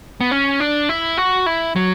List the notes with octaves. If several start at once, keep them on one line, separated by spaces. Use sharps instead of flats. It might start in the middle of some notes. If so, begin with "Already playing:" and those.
B3
C#4
D4
E4
F#4
E4
F#3